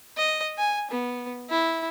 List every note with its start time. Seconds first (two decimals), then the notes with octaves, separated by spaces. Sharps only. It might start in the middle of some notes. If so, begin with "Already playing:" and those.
0.17 D#5
0.58 G#5
0.91 B3
1.50 E4